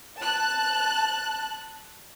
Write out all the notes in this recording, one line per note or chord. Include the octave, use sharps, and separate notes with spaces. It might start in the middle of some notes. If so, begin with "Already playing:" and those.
A5 F#6